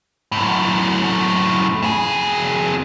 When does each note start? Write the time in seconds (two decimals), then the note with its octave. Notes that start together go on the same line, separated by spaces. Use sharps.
0.32 F#2 A2
1.82 F2 G#4